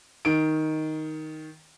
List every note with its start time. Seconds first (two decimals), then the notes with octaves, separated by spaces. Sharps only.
0.25 D#3 D7